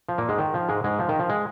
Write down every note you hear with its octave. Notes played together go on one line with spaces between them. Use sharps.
F3
A#2 A#3
G#2 G#3
D#3
F3
G#2 G#3
G#2 G#3
F3
D#3
F3
G#3